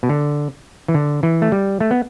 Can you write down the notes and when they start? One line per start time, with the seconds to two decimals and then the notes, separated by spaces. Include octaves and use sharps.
0.03 B2
0.09 D3
0.88 E3
0.94 D3
1.23 E3
1.42 A3
1.52 G3
1.80 A3
1.91 B3